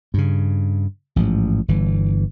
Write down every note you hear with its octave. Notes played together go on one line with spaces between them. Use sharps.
G2 C#3
A1 G#2 F3
G1 E3